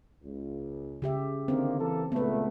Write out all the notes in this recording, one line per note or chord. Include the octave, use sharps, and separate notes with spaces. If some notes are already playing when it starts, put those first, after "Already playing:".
C#2
C#3 G4 E5
D3 D#3 A#3 C4
E3 A#3 A4
C#2 A#2 A3 B3 B4